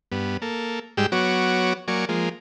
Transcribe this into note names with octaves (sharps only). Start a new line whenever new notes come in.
G2 B3
A#3 A4
G#2 G3 G#3 G5 E6
F#3 B3 F#4 C#5 D6
F#3 A#3 D5 G#5 C#6
F3 G#3 A#3